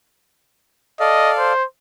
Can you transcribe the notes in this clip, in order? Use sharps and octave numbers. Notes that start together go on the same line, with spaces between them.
A4 D5 D#5 F5
C5